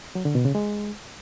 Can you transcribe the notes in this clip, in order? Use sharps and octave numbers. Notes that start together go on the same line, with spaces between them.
F#3
D3
B2
C#3
G#3